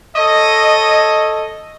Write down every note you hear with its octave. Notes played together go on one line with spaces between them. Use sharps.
A4 C#5 D#5